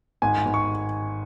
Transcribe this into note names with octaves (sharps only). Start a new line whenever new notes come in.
G#1 G#5
G#1
C#6